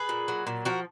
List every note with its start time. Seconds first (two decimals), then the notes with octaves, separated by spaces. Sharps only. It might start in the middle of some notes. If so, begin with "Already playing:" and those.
Already playing: G#4 B4
0.09 A#2
0.28 F#3
0.47 A#2
0.65 F3 F#4 A#4